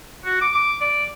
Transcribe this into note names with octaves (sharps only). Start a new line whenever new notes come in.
F#4
D6
D6
D5